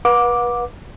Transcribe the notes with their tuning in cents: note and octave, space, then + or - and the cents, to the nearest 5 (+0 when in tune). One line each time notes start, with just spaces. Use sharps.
B4 -30 F#5 -40 D6 +0